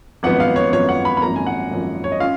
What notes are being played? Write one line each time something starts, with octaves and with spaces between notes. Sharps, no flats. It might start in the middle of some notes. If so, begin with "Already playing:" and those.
G#1 F#2 F3 B3 F#5
F5
C#5
G#1 F#2 F3 B3 C#5
F#5
B5
B5
G#1 F#2 F3 A#3 A#5
G#5
F#5
G#1 F#2 F3 A#3
C#5
D#5
C#4 F4 F5